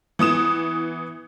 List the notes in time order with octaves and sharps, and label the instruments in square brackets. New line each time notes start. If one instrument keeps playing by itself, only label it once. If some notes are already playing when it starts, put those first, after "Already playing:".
[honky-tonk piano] E3 B3 D#6 E7